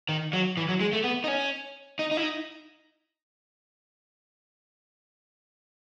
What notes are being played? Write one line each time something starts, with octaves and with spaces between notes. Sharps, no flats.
D#3
F#3
E3
F#3
G#3
A3
B3
D#4
C#4
D#4
D#4
E4
D#4